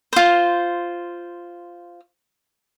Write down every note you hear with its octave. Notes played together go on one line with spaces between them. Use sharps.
F4 C5